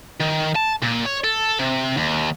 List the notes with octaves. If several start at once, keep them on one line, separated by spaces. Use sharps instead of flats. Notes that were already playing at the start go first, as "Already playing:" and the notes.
D#3
A5
A#2
C#5
A4
C3
D#2